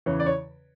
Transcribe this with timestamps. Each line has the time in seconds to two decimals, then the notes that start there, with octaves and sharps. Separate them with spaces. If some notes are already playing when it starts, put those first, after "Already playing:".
0.06 E2 C#3 E3 C#5
0.20 D5
0.26 C#5